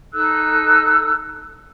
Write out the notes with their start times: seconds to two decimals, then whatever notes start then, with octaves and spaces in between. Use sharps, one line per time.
0.13 D#4 A4 E6 F#6